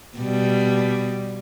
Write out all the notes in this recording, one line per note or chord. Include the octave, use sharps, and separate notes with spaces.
B2 G3